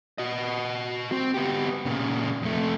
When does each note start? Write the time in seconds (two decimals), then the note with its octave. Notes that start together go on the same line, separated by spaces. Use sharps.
0.18 F#4 D#5
1.12 C4
1.34 B3 G4
1.85 A#2 C#3
2.42 F2 A3